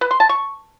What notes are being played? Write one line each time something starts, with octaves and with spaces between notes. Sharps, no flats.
B4
C6
A5
C#6